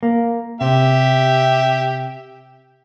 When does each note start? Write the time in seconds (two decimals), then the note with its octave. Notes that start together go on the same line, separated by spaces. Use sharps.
0.03 A#3
0.61 C3 G4 E5